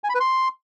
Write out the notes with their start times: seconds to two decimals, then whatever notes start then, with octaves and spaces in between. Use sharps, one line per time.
0.04 G#5
0.09 B5
0.15 B4
0.20 C6